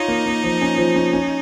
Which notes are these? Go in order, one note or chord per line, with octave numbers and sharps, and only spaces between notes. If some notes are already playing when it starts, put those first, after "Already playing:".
Already playing: D#4 F4 C#5
A#3
A#3
F3
C#4
F3
C#4
C#4